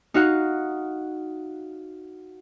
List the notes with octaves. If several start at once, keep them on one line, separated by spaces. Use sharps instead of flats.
D#4 F#4 F5 F#5